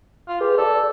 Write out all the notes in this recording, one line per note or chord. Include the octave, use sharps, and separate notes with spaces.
F4
G4 G#4 B4
A4 D5